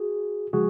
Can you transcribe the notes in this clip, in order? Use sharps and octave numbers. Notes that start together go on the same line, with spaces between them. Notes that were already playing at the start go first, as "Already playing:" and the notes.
Already playing: F#4 G#4
C#3 F3 G#3 F#4 G#4